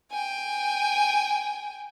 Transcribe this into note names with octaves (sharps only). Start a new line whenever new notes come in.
G5 G#5